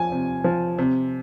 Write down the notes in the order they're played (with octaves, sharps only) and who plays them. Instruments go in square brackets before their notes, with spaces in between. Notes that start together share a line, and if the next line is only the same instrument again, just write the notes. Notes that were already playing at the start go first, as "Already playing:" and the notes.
Already playing: [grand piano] F3 G#5
C3
F3
C3